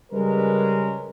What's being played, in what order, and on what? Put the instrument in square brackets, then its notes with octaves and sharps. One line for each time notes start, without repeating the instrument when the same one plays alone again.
[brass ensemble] C#3 G3 G#3 C#4 A#4 B4